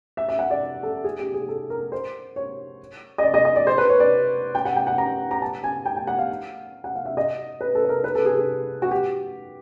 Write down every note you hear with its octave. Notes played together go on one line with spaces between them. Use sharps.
E5
E5
F#5
D5
A4
G#4
G4
G#4
A4
A#4
C5
C#5
D#5
D5
D#5
D#5
D5
C5
B4
C#5
D5
G5
F#5
G5
F#5
A#5
A#5
A5
G#5
G5
G5
F#5
F5
F#5
F5
E5
D#5
B4
A4
B4
A#4
B4
A4
G#4
G#4
F#4
G4